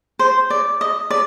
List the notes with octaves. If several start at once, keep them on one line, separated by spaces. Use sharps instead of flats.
C5
D5
D#5
D5